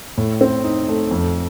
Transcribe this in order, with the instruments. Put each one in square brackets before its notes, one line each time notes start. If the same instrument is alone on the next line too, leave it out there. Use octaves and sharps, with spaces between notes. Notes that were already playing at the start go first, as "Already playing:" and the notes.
[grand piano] A2
C4
D#4
A3
F2